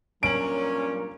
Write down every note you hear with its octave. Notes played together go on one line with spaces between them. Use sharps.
G2 A#2 F#3 C#4 A#4 D7 F#7